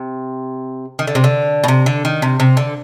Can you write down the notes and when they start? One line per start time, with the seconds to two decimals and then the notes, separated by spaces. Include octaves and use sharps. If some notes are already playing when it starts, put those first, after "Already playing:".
Already playing: C3
0.99 D#3
1.07 D3
1.15 C3
1.24 D3
1.64 B2
1.68 C3
1.86 D3
2.05 D#3
2.22 C3
2.40 C3
2.57 D3